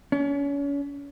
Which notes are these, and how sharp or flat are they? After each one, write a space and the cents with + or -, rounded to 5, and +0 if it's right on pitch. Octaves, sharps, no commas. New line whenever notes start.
C#4 +35